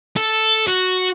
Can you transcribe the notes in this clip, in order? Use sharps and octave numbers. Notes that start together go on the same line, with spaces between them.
A4
F#4